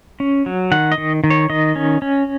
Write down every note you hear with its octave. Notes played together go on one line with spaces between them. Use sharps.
C#4
F#3
D#3 F#5
D#5
D#3
D#3
C#5
D#3 D#5
C#4
C#4